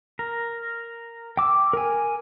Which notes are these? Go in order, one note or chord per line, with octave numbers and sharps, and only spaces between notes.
A#4
G5 D6 E6
A#4 G#5